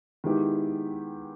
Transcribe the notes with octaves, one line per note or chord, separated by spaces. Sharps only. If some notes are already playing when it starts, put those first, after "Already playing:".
D#3 G#3 B3 E4 G4